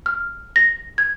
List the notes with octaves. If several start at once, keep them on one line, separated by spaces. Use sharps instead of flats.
F6
A#6
G#6